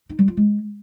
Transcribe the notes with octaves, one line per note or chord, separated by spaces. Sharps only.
D#4
G3
F4
G#3